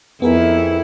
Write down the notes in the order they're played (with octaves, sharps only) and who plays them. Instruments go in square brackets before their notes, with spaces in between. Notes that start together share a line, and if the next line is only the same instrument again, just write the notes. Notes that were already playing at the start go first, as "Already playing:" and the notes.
[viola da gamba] F2 E4 [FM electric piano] B3 G#4 A#4